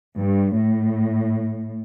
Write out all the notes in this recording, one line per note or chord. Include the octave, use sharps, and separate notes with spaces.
G2
A2